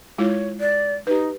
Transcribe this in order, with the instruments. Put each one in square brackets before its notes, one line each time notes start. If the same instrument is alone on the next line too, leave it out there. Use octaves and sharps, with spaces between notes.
[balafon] G#3 E4 F4 [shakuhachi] C#5
[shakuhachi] D5
[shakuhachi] D#4 [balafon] G4 B4